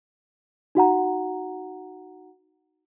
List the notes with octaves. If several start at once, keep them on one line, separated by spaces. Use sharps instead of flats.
D#4 F#4 F#5 A#5